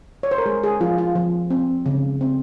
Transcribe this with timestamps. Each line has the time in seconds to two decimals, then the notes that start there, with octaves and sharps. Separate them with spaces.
0.23 C#5
0.31 C5
0.38 A#4
0.46 G#3 G#4
0.64 G#4
0.80 F3 F4
0.98 F4
1.15 F3
1.50 C4
1.86 C#3
2.21 C4